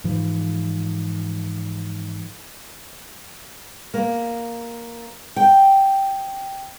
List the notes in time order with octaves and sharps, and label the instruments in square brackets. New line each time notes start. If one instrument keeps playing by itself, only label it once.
[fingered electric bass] G#2 E3 F3
[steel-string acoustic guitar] A#3
G5